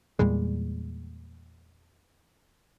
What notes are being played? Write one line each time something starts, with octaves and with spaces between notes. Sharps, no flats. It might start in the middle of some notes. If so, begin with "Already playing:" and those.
E2 A#2 G3 G#3